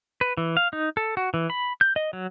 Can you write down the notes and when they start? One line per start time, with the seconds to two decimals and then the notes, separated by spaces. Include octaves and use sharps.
0.21 B4
0.37 E3
0.57 F5
0.73 D#4
0.97 A4
1.17 F#4
1.34 E3
1.50 B5
1.81 G6
1.96 D#5
2.13 F#3